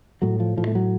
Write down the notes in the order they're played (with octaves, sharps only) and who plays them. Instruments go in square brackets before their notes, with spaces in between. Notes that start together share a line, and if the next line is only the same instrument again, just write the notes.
[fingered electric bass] A2 F#3
F3
A2 F3
A3
F#3